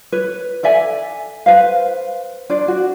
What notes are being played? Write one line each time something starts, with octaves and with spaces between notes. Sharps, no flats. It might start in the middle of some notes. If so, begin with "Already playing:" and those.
B4 C#5
A4 D5 E5 G#5
B4 C5 F5
D4 C5 D5
F#4